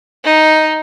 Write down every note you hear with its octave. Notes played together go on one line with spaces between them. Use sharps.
D#4